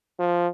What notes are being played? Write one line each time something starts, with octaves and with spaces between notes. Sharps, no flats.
F3